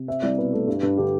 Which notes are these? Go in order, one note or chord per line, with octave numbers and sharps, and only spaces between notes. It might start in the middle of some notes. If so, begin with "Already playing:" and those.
Already playing: C3
C4 E5
C2 D5
B2 B4
A3
G2
G2
D3 G4